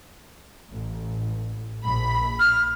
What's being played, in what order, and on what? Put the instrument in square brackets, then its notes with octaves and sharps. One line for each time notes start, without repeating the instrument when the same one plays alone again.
[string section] A1
A#1 B5
[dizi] F6